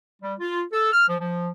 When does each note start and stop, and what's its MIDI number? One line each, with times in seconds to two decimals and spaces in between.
0.22 0.34 55
0.40 0.62 65
0.73 0.92 69
0.93 1.05 89
1.09 1.16 53
1.20 1.49 53